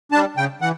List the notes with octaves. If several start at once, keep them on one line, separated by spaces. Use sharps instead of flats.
G3 D4 A5
C#3 G5
E3 F#5